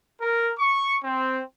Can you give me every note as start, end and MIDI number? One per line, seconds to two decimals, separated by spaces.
0.20 0.50 70
0.57 0.96 85
1.02 1.40 60